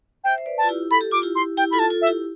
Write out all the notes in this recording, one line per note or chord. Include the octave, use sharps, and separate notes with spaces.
C5 E5 G5
C5
B4 D5
A5
F4
E4 G4
A4 B5
G4
F4 D6
E4 G4
C6
E4 G4 G5
F4 A4 B5
A5
F4 A4
E5
E4 G4